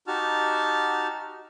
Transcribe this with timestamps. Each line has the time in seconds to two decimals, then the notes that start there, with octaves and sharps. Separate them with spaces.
0.07 D#4 F#4 G4 A5 F6